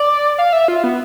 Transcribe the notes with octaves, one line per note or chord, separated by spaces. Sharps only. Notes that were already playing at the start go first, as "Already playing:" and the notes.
Already playing: D5
F5
E5
F4
B3